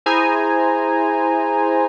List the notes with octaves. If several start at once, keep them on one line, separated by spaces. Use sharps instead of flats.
E4 G#4 C5 G#5 A#5